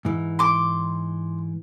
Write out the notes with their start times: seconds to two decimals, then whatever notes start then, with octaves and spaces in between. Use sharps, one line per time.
0.05 G#2 E3
0.39 C6 D6